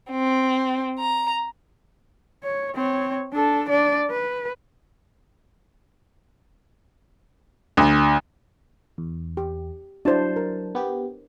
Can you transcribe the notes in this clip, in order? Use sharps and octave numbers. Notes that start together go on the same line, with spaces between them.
C4
A#5
C#5
C4 C#5
D4 A4
D4 D5
B4
D2
E2
G4
F#3 D4 E4 C5 A5
A#4
B3 G4